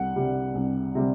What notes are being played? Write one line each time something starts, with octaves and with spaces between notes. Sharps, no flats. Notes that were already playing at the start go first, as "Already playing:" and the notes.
Already playing: C2 F#5
C3 G3
C2
C3 G3